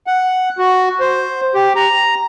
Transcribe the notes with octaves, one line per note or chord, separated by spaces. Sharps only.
F#5
F#4
C5
G4
A#5